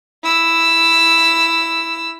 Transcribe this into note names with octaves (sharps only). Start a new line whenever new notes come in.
E4 E6